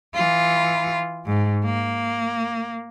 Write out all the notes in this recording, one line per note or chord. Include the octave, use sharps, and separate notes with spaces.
E3 F4
G#2
A#3